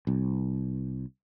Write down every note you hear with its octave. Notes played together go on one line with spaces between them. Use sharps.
C2